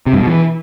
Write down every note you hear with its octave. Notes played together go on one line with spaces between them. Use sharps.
C3
G2
B2
E3